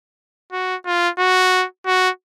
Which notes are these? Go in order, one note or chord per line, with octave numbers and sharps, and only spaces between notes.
F#4
F4
F#4
F#4